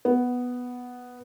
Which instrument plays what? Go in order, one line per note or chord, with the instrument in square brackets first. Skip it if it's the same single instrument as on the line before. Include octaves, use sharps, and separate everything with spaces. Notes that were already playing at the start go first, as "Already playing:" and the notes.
[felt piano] B3